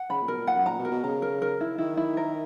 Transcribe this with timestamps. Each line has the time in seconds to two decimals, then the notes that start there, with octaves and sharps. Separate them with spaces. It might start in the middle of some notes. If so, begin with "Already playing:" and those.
Already playing: F#5
0.10 C#3 B5
0.22 A#2
0.28 B2 A#4
0.37 A#2
0.47 A#2 F#5
0.56 F#2
0.66 A#2 A#5
0.79 B2
0.85 A#4
0.91 B2
1.03 C#3 A#5
1.22 A#4
1.42 A#4
1.61 E4
1.78 D#3 E4
1.97 E4
2.17 A#4